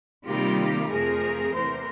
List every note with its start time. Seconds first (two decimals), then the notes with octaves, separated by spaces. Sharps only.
0.25 C3 D#3 G3 A#3 F4 G4
0.88 F2 C3 F3 A3 G#4 A#4
1.52 E2 C3 E3 A3 A#4 C5